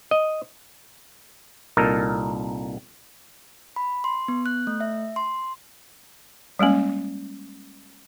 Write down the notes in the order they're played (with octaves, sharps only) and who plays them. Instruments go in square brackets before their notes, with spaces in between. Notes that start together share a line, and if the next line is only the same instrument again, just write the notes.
[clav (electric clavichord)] D#5
C2 A#2 D#4 A4 A#4
[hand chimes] B5
C6
B3
F#6
A3
E5
C6
[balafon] G3 G#3 A#3 C#4